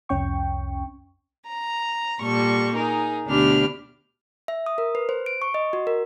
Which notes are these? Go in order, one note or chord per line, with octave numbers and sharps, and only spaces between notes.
C2 F2 C#4 G5 C#6
A#5
A#2 G3 A4 C#6
D#4 G#4 A#4
D2 B2 D4 G4 B5 F6
E5
D#6
A#4
B4
C5
D7
C#6
D#5
F#4
A#4